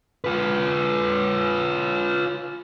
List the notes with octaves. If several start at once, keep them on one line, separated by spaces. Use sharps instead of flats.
F4 B4